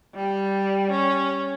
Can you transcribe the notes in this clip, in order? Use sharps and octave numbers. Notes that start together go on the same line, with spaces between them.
G3
C#4